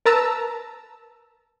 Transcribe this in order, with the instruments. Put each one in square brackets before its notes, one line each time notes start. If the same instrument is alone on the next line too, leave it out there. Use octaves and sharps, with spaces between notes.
[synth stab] A#4 B4 A5 A#5 E6